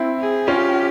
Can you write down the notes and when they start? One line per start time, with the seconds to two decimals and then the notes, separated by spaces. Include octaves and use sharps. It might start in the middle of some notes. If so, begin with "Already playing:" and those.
Already playing: C4 E4
0.19 G#4
0.47 C#4 F4 G4